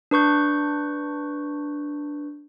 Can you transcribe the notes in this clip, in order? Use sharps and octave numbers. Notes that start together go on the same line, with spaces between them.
D4 B4 C#6 G6